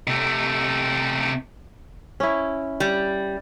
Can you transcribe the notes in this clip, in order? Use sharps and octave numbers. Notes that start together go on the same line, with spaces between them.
C3 A3
C#4 E4
G3